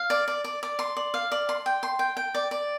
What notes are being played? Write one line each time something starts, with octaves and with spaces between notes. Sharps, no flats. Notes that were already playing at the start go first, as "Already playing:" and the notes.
Already playing: F5
D5
D5
D5
D5
C6
D5
F5
D5
C6
G5
C6
G5
G5
D5
D5